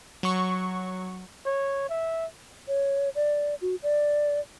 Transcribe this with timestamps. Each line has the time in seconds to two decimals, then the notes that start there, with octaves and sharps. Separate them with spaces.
0.23 F#3 C#6
1.45 C#5
1.89 E5
2.68 C#5
3.15 D5
3.61 F#4
3.83 D5